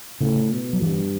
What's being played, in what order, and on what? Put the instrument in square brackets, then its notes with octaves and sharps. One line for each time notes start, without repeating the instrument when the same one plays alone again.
[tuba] A2 [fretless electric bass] C#3
[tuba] B2
[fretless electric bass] F#3
[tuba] G2 [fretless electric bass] E3